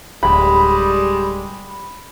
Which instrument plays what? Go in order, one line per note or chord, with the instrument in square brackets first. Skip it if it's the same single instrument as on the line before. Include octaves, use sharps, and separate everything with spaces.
[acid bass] D1 [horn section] G3 G#3 [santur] B5